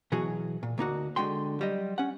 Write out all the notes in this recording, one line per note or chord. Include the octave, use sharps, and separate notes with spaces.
B2 E3 F#3 F#4 G#4
A#2
D2 A#3 D#4 F#4
D3 G#3 F#4 G5 C6
F#3 G3 D#5
C#4 F#5